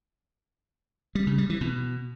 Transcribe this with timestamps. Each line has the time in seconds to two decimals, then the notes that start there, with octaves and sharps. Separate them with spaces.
1.15 G3
1.27 C#3
1.38 G3
1.50 E3
1.61 B2